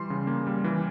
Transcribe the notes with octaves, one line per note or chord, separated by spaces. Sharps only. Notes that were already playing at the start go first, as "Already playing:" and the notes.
Already playing: E3 G3 C6
C#3
A#3
G3
E3